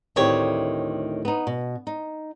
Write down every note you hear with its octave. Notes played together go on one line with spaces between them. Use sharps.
D2 A2 D#3 C4 G4 C#5
B3 D#4
B2
D#4